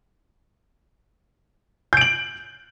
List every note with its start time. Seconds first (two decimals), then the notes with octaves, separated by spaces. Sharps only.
1.93 G6
1.97 D7
2.01 F#7